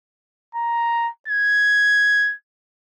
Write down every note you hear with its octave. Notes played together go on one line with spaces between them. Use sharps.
A#5
G#6